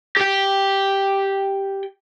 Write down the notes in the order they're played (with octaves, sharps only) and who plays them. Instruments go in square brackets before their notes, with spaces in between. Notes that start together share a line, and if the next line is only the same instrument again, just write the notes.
[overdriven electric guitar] G4 G5